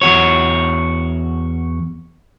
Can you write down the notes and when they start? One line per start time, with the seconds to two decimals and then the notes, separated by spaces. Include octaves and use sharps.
0.02 E2 F#4 C#5